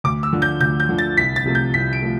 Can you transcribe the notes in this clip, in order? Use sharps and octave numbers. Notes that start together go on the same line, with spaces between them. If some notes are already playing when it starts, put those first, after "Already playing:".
D2 D6
E6
D3 F3
G6
D2 G6
G6
D3 F3
A6
C2 B6
A6
C3 F3 A3
G6
C2 B6
D7
F3 A3